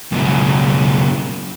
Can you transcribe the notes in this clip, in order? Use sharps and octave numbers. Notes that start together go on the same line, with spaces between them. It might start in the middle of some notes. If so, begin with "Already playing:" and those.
C#2 F#2 B2 E4